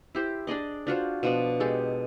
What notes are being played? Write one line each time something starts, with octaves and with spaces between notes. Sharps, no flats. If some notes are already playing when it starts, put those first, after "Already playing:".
E4 G4 C5
D4 G#4 D5 D#5
D4 F4 F#4 C5
B2 F3 D4
G#3 G4 A4